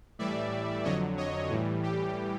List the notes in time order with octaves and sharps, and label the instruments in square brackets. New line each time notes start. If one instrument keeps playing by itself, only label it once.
[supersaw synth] A2 E3 G3 D5 E5
F2 D3 F#3 C#5 D#5
C#5 D#5
A2 E3 G3
G4